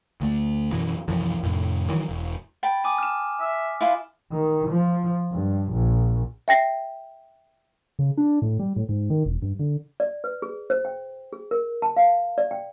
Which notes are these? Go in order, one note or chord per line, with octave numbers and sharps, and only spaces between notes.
D2 A3
F#2 B2 E3
C2 F#2 E3 F3
F2 A2 C3
D#3 E3 F#3
E1
G5 A5 B5
G#5 D6 D#6
F6 E7
E5
E4 F4 B4
D#3
F3
G2
A#1
E5 G5 A#6 C7
C#3
D4
A2
G3
A2
G#2
D#3
E1
G2
D3
D5
B4
G#4
C5
G5
G#4
A#4
A5
F5
D5
G5